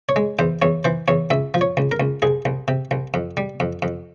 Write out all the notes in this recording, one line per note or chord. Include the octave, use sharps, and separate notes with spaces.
C#5
G#3
E2 C5
E2 C#5
E3 C5
E2 C#5
C#2 E5
F3
C#5
C#2
A#4
C#2
C2 G#4
C2
C3
C2
F2
G3
F2
F2